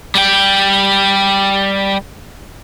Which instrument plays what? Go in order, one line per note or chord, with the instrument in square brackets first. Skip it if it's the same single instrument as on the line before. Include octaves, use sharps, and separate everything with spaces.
[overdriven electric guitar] G3 G5